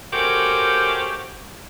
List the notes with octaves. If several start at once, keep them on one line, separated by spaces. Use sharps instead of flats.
A3 C#4 F#4 G4 A#4 C5